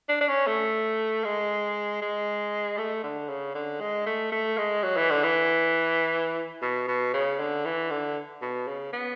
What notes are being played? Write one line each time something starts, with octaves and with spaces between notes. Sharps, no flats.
D4
D4
C#4
A3
G#3
G#3
A3
D3
C#3
D3
G#3
A3
A3
G#3
F#3
E3
D3
E3
B2
B2
C#3
D3
E3
D3
B2
C#3
B3